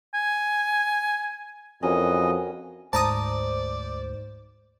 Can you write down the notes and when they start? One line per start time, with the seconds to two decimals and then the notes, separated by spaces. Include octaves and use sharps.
0.14 G#5
1.83 F2 E3 C#4 F#4 A#4 D#5
2.93 D2 G#2 C5 D5 A5 A#5 D#6